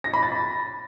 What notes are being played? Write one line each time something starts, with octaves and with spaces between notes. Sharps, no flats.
A#6
B5
A6
B5